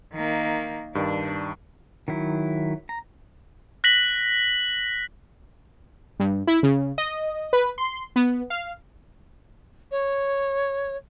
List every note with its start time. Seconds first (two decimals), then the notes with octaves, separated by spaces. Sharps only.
0.13 D#3 A#3
0.95 G2 D#3 D4
2.08 D#3 F#3 E4
2.89 A#5
3.84 F#6 A#6 B6 F#7
6.20 G2
6.47 E4
6.63 C#3
6.98 D#5
7.53 B4
7.78 C6
8.16 B3
8.50 F5
9.91 C#5